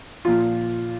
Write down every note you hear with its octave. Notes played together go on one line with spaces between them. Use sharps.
A#2 F3 F4